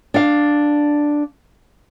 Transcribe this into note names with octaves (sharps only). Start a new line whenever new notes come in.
D4 F5